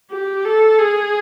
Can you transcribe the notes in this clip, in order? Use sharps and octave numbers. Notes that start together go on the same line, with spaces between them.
G4
A4
G#4